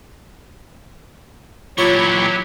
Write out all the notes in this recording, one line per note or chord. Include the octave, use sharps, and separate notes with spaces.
A#2 E3 F#3 E4 F4 G4 C#5 C#6